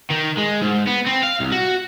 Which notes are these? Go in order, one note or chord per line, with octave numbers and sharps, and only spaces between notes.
D#3
G#3
G#2
B3
C4
F5
C2
F#4